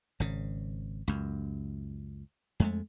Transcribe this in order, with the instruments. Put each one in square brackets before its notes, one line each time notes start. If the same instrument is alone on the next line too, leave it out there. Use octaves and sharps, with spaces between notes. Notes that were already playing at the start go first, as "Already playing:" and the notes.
[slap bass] G#1 C#3
C#2 F#2
F2 G#3 A3